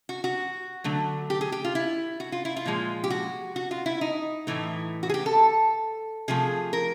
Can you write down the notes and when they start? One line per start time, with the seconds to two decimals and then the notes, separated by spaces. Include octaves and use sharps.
0.09 F#4
0.24 F#4
0.84 D3 F#3 A3
1.30 G4
1.41 G#4
1.52 G4
1.65 F4
1.75 E4
2.20 F#4
2.32 F4
2.45 E4
2.57 F4
2.66 A#2 F3 G#3
3.04 G4
3.10 F#4
3.56 F#4
3.71 F4
3.86 E4
4.01 D#4
4.47 A2 E3 A3
5.03 F#4
5.09 G#4
5.14 G4
5.26 A4
6.28 C3 F3 A3 G#4
6.73 A#4